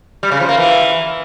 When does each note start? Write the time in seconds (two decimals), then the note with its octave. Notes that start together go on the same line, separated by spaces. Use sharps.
0.23 G3
0.32 C#3
0.40 F3
0.49 A#3
0.57 E3